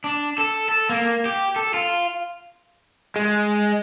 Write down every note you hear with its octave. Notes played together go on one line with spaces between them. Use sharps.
D4
A4
A4
A#3
G4
A4
F4
G#3